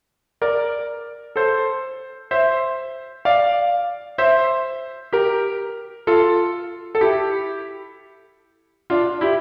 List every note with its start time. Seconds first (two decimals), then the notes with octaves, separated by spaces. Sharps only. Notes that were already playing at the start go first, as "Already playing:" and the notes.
0.42 A#4 D5
1.36 A4 C5
2.31 C5 E5
3.25 D5 F5
4.18 C5 E5
5.13 G4 A#4
6.07 F4 A4
6.95 A4
7.01 E4 G4
8.90 D4 F4
9.21 E4 G4